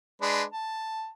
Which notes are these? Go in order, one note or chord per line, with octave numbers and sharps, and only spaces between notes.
G#3 D4 B4
A5